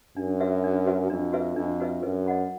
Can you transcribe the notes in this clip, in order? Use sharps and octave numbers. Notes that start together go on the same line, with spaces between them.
F#2 D4
F#4 B4 E5
D4
F#4 B4 E5
F2 D4
F#4 B4 E5
F2 D4
F#4 B4 E5
F#2 B4
D#5 F#5 B5